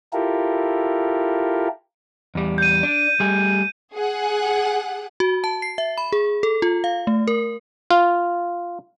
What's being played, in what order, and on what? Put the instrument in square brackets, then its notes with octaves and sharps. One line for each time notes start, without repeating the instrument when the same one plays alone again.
[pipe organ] E4 F4 G4 A4 A#4
[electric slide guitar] E2 G3
[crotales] G6 D#7
[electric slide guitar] D4
G3 A3 G#4
[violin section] G#4 F#5
[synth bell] F#4
A5
C7
E5
B5
G#4
A4
F4
F5
A3
A#4
[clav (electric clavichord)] F4